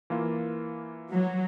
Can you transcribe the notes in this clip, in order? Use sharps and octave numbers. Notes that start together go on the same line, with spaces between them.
E3 A#3 F4
F#3